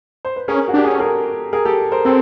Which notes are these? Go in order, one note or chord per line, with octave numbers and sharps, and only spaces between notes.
C5
B4
C#4 G#4 A#4
F#4
D4 G4
G#4
C#4 A4
G#4 A#4
G#4 A#4
G4 A4
A#4 C5
C4 A4 B4